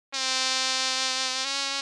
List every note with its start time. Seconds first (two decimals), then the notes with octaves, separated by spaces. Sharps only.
0.14 C4
1.45 C#4